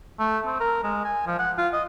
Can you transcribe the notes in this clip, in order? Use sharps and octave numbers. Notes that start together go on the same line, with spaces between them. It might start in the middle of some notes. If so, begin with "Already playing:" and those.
A3
C4
A#4
G#3
G#5
F3
F#5
F4
D#5